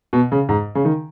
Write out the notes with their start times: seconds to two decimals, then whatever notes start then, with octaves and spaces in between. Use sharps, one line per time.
0.13 B2
0.32 C#3
0.49 G#2
0.75 C#3
0.85 D#3